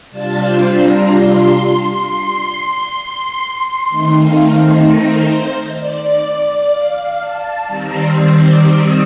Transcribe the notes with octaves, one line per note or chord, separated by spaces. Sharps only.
C3 G3 D4 F4 A5
C5
A#5
C6
D#3 A3 C4 D#4
F5
A#5
C5
D5
F5
A5
D#3 G3 C4 A#5
C6
D6
D#6